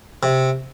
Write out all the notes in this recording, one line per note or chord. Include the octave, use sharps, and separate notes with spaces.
C3